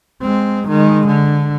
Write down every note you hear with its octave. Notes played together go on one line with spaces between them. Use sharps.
G#3 C4
D#3 G#3
D3